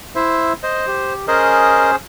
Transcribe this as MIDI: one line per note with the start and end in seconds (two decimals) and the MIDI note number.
0.15 0.53 64
0.15 0.53 72
0.15 0.53 76
0.63 1.14 72
0.63 0.86 75
0.88 1.26 67
1.28 1.96 61
1.28 1.96 68
1.28 1.91 70
1.28 1.96 72
1.28 1.91 75